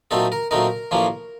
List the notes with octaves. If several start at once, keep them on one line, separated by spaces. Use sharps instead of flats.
A#2 F#3 A3 C4 D#4 A4
A#4
A#2 F#3 A3 C4 D#4 A#4
A1 A2 F3 A#3 C#4